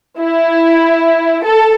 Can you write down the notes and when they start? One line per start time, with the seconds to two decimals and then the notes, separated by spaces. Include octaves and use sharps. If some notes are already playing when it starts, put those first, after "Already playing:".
0.19 E4
1.45 A4